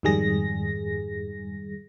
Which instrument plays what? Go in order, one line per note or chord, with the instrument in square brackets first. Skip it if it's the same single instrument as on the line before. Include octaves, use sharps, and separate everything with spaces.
[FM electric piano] F2 G#2 D#3 G3 G#4 A#6